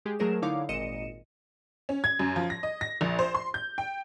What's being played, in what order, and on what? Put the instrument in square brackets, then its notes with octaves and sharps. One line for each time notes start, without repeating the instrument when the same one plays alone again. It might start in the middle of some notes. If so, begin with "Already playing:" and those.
[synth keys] G#3 G4 G#4
F#3 A3 G#4 A#4 C5 E7
D3 D#4 E4 C#5 F5 D6
G#1 A#2 D#5 C#7 D#7 E7
[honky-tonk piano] C#4
G#6
F#2
F3
A#6
D#5
A#6
A#1
C5
C6
G6
G5